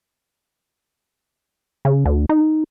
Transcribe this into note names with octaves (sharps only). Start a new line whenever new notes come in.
C#3
D2
D#4